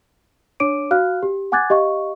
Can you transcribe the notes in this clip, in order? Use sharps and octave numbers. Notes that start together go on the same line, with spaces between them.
D4 C#5 D6 D7 D#7
F#4 F5 F6 F#6
G4
F#5 G#5 D6 F#6 G#6 A6
G4 D#5 F5 C#6